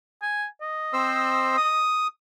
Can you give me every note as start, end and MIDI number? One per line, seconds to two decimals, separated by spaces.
0.22 0.46 80
0.62 1.84 75
0.93 1.57 60
0.93 1.57 72
0.93 1.57 88
1.57 2.07 87